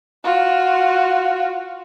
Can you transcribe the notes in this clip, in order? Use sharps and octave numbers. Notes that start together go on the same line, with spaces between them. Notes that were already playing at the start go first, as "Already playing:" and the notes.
F4 F#4